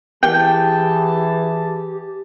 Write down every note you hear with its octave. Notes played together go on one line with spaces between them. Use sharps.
E3 G4 G#4 G5 A5